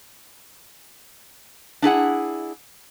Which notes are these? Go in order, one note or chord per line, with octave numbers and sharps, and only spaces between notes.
D4 E4 G#4 F#5